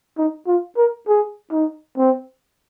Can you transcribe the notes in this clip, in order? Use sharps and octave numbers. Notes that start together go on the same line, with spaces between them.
D#4
F4
A#4
G#4
D#4
C4